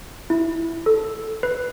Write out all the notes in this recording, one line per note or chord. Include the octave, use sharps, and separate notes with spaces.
E4
A4
B4